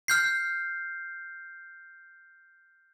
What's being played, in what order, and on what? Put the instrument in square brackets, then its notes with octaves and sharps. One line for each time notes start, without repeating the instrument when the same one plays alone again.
[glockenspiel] F6 G6 C7